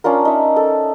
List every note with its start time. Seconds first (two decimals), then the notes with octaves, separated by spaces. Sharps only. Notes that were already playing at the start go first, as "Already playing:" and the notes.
0.04 C#4 D4 F4 A#4
0.25 D#4 E5
0.56 A4